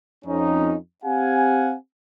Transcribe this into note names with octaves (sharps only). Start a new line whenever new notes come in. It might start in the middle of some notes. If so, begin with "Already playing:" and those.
F2 C#4 D#4
C4 G4 F5 F#5 G#5